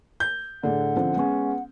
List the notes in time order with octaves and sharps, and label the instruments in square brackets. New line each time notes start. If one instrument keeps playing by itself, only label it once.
[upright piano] G6
[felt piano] A2 G#4 D5 [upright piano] D3 [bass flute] F#5
[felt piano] F3 C4 C#4
[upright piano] G#3 C#4 [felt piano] B3